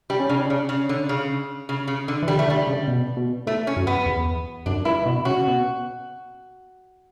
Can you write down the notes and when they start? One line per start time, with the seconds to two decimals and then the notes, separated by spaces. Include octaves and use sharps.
0.10 G3 D4
0.20 C#4
0.29 C#3 D4
0.40 D4
0.50 C#3 C#4
0.69 C#3
0.89 D3
1.09 C#3
1.69 C#3
1.88 C#3
2.08 D3
2.23 E3
2.28 D3 G3
2.39 A3
2.48 D3 G3
2.67 C#3
2.88 B2
3.17 B2
3.46 A2 A3
3.67 C#4
3.77 F#2
3.87 B3
4.06 E2
4.66 F#2 D4
4.85 G2 E4
5.06 B2
5.25 C#3 F#4
5.47 B2